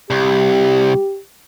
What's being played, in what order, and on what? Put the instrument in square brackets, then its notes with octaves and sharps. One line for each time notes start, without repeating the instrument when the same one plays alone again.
[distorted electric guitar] C2 [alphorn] G4